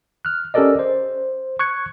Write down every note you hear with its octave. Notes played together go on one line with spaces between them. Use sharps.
F6 F#6
C#4 G4 A4 A#4 D5 D#5
C5
C#6 F#6 G#6 C#7